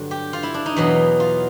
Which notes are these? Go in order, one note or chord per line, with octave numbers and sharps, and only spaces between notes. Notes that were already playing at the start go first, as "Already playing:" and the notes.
Already playing: G2 D3 F#3
G4
F4
E4
D4
D#4
E2 B2 F#3
F4